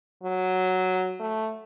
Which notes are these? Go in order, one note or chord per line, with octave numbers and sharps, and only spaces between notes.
F#3
A3